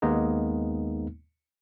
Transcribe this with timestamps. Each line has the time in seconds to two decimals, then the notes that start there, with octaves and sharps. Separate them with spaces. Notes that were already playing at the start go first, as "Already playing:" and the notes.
0.02 D#2 G#3 A#3 B3 D#4